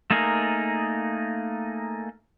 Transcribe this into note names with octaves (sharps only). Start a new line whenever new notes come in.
A3 A#3 D#4 G#4 A#4